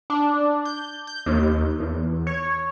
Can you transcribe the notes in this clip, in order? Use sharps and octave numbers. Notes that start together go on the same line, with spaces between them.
D4
G6
G6
D#2
E2
C#5